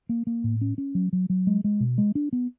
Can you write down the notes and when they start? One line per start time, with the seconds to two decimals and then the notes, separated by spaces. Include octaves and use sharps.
0.09 A#3
0.27 A#3
0.44 A2
0.61 C#4
0.78 C#4
0.95 F#3
1.13 F#3
1.30 F#3
1.47 G#3
1.64 G#3
1.80 B2
1.98 G#3
2.15 D4
2.33 B3